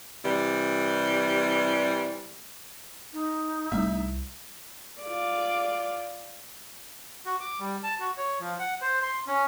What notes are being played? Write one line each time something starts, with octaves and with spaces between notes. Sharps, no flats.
C3 E3 G3
D#4
C2 G3 A3 C4 E5
F4 D5
F#4
D6
G3
A5
F#4
C#5
F3
F#5
C5
C6
C#4